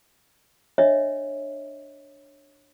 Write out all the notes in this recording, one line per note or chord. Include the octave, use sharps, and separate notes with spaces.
D4 C#5 D#5 E5